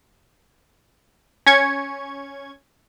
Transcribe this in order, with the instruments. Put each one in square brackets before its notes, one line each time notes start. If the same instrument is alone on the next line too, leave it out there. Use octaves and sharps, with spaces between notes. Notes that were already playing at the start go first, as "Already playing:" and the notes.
[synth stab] C#4 C#6 G#6